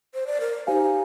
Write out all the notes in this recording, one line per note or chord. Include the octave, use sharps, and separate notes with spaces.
C5
D5
A#4
D#4 G4 C5 F5 G#5